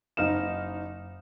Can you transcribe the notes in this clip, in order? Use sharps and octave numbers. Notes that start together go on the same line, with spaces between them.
F#1 D#4 F6 E7